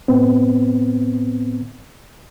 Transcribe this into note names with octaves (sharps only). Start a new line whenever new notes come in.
A2 B3 C4